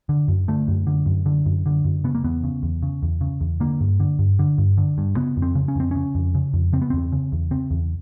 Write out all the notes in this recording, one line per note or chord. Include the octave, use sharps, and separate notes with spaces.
D3
F#2
D3 A3
F#2
D3
F#2
D3
F#2
D3
F#2
C#3 B3
A#3
E2 B3
C#3
E2
C#3
E2
C#3
E2
D3 A#3
G2
D3
G2
D3
G2
D3
G2
C#3 B3
F2
C4
C#3
C#4
F2 C4
C#3 C#4
F2
C#3
F2
C#3 C4
B3
E2 C4
C#3
E2
C#3 C4
E2